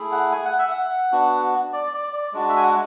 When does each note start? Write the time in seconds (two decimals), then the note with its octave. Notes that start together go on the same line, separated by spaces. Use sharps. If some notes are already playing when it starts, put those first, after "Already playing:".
Already playing: A3 E4 G#4
0.12 F#5
0.32 G#5
0.45 F#5
0.58 E5
0.71 F#5
1.12 B3 D4 F#4
1.73 D5
1.93 D5
2.13 D5
2.33 G#3 D4 F#4
2.49 E5
2.57 G#5
2.63 F#5